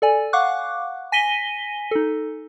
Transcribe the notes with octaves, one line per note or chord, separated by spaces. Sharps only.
A4 D5 G#5
F5 F#5 C#6 D6 F#6
G#5 A#6 B6 D#7 G7
D#4 A4